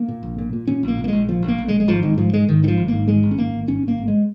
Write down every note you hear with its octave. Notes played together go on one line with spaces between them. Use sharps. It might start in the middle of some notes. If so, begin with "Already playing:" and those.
Already playing: A#3
A#2
A#1
A#2
A#2
A#2 C#4
A#1 A#3
A#2
A#3
A#1 G#3
A#2 F3
A#1
A#3
A#1
G#3
A#1
G#3
G#1 F3
G#2 D#3
G#2 F3
G#2 G#3
G#2 D#3
G#1 D#3
F3
G#1
G#2 A#3
G#1 G#3
G#1
C#4
G#1 A#3
G#1
G#1 C#4
G#1 A#3
G#1
G#3